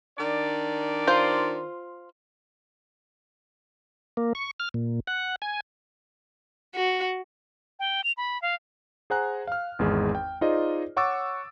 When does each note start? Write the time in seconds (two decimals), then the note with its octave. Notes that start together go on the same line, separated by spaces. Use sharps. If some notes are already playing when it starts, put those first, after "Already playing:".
0.18 D#3 D4 D5
1.07 F4 C5
4.17 A#3
4.35 C#6
4.60 F6
4.74 A#2
5.07 F#5
5.42 G#5
6.75 F#4
7.79 G5
8.04 F7
8.17 B5
8.42 F5
9.10 G#4 C5 F#5 G#5 A#5 F#6
9.47 F5 F6
9.79 G#1 E2 G#3 G#4
10.15 G5
10.41 D#4 F4 G#4 C5 D5 D#5
10.96 C#5 F#5 C#6 D6 E6 A6